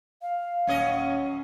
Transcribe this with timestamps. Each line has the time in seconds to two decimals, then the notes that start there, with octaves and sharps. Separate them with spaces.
0.22 F5
0.67 D#1 F#2 C#4 D#5